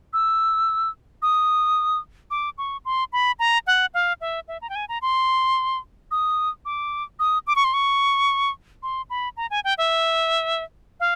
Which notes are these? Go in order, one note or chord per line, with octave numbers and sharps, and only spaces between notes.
E6
D#6
D6
C#6
C6
B5
A#5
F#5
F5
E5
E5
A#5
G5
G#5
A#5
C6
D#6
D6
D#6
D6
C#6
C6
C#6
C6
B5
A#5
G#5
G5
E5
F5